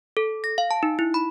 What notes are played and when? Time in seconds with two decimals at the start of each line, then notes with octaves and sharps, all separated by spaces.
0.17 A4
0.44 A#6
0.58 F5
0.71 A5
0.83 D#4
0.99 E4
1.14 B5